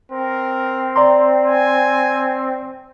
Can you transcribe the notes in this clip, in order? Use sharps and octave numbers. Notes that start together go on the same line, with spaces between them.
C4 A#4
D5 A#5 C6
G#5